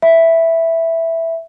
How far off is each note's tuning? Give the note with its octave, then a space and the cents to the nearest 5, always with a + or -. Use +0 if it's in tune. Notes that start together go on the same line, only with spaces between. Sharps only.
E5 +0 B5 +0